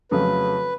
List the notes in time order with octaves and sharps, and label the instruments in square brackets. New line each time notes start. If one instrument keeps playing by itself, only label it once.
[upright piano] F2 C#3 F#3 A3 [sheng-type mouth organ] B4